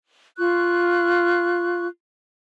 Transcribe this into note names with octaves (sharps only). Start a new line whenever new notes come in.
F4 C#6 F#6